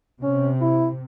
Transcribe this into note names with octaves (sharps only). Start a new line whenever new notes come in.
C3 C#4
E4